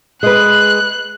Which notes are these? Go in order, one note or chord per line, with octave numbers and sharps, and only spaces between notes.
G#3 B4 F#6